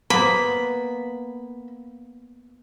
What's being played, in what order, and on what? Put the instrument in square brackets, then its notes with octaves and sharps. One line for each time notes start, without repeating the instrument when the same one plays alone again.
[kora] A#3 B3 [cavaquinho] B5